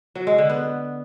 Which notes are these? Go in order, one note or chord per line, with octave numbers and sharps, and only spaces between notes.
F#3
G#3
D3
B3